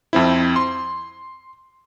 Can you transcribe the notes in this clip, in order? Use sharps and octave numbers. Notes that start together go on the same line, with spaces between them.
F2 C4 E4
C6